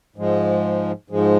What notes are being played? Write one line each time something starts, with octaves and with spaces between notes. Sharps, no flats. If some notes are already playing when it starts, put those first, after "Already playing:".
G#2 F3 G#3
G#2 F3 G#3